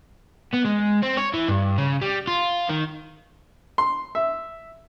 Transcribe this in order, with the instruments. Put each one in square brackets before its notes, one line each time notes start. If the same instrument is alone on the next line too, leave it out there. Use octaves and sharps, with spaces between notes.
[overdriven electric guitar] B3
G#3
C4
C#5
E3
G2
C#3
G3
F4
D#3
[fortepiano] C6
E5